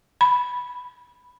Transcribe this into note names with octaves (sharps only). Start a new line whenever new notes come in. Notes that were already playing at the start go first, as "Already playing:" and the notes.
B5